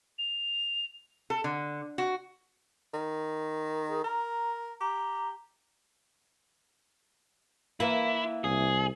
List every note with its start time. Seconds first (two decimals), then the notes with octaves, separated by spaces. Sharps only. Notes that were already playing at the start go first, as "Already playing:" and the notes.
0.18 F7
1.30 A4
1.44 D3
1.98 F#4
2.94 D#3
3.89 G#4
4.04 A#4 A#5
4.81 G4 A#5
7.80 E3 A#3 E4
8.44 C2 G#4